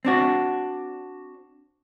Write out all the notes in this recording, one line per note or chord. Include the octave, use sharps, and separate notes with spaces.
C4 D4 F#4